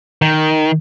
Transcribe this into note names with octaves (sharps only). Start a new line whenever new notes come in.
D#3